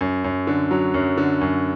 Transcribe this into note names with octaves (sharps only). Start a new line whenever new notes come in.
F#2
F#2
D3
F#3
F#2
D3
F#2